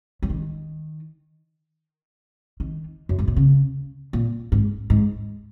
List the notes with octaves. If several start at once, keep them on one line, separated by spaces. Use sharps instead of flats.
F#3
D#3
D#3
F#2
G#2
A#2
C#3
A#2
G#2
G#2